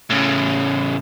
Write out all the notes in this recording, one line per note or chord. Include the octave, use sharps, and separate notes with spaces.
A2 C#3